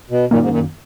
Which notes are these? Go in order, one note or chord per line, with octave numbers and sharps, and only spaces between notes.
B2
F#2 A#2 D#3 A#3
G#2
A#2